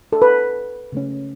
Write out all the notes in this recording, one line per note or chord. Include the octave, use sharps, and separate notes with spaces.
A4
B4
C#3 A3 C#4